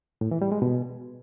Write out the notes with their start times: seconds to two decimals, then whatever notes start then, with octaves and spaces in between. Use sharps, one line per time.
0.21 A2
0.31 E3
0.42 G3
0.52 G#3
0.62 B2